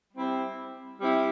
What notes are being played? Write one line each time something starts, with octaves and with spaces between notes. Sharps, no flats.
G3 C4 E4
G3 C4 E4